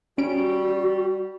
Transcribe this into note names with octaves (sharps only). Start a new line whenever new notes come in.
G3 C#4 F#4 D7